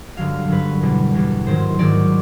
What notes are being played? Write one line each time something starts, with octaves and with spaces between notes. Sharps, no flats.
G2 D3 F#3 F5
G2 D3 F#3 B4
E2 B2 G3
E2 B2 G3
G#2 D#3 F#3 C5
G#2 D#3 F#3 D5